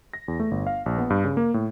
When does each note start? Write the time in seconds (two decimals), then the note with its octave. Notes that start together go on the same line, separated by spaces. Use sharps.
0.13 A#6
0.28 E2
0.39 A3
0.51 G1
0.67 F5
0.86 A#1
0.98 B3
1.10 G2
1.25 C#3
1.37 A#3
1.54 A2